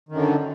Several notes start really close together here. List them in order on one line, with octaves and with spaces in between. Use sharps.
D#3 F#2 D3